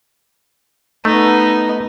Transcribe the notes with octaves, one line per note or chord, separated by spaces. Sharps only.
A3 B3 D#4